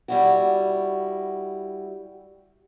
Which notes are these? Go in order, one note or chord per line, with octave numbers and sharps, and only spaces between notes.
G3 E4 F#4